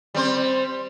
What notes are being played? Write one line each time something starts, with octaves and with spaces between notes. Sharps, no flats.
G3 C4 C5